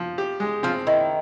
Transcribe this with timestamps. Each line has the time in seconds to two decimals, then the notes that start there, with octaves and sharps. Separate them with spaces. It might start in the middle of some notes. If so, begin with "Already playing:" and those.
Already playing: F3
0.18 G4
0.40 G#3
0.63 F3 C4
0.87 D#3 E4